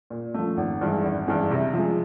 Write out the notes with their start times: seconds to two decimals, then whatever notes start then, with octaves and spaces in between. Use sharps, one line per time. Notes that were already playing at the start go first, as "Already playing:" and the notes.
0.10 A#2
0.34 F3 A3
0.57 G#1
0.81 G2 E3 G#3
1.04 G#1
1.27 G2 E3 G#3
1.51 C3
1.74 F3 G#3